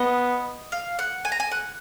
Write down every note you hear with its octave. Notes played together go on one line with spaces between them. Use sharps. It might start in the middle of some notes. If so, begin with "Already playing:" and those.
Already playing: B3 D#5
F5
F#5
G#5
A#5
G#5
F#5